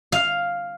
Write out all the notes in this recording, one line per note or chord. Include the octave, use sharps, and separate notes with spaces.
F5